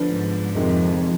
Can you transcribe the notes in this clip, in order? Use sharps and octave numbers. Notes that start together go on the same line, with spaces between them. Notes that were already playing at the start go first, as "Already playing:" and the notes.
Already playing: D3 F3 B3 D4
G#2
F2 C3 D#3 G#3